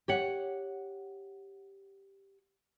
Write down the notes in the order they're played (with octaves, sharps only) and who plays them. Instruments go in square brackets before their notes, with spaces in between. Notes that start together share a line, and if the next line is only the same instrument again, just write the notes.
[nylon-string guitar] G4 C#5 F#5